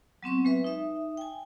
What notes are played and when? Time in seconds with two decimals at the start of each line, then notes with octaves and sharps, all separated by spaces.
0.23 F#3 B3 C4 C#6
0.45 G#3 B4 E5
0.64 D#4 E5
1.17 G5 G#5